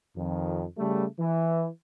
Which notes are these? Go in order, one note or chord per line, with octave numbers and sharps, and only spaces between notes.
F2 D#3
C#3 G3 A3
E3